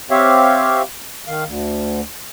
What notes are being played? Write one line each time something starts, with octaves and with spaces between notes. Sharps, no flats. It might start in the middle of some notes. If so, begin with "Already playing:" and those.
C4 G4 C#5 E5 F5
D#3 F5
D2